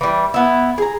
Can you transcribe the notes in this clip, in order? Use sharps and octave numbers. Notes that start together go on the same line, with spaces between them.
E3 G3
B3 E4
G#4 A#5